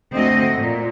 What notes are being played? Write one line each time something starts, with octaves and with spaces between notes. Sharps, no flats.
D2 A3 C4 F#4 D#5
A#2